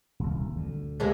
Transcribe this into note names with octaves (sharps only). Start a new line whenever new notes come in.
D#1 C2
D2
C3 G#3 A#3